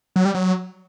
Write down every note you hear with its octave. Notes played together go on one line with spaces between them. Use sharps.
F#3
G3
F#3